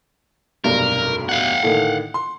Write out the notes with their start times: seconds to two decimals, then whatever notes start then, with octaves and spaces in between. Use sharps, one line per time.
0.64 F1 B1 G2 A#4
1.29 F5 F#5
1.63 A2 D3 D#3
2.14 C6